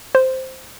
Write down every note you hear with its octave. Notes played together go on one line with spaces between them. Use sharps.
C5